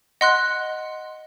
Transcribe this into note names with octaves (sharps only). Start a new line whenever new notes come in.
D#5 F#5 C6 F#6